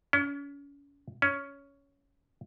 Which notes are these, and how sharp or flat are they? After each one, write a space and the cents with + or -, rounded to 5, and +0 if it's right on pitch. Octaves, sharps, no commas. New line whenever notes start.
C#4 +35
C#4 +10